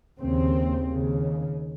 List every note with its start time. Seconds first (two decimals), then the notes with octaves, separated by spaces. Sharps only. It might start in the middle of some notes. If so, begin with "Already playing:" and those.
0.18 D#2 C#3 C4
0.90 D#2 C#3